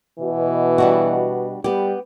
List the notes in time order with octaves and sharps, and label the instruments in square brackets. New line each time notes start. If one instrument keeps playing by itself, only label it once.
[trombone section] B2 [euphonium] E3
[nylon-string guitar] G3 D4 F#4
[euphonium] G3 [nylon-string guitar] B3 G4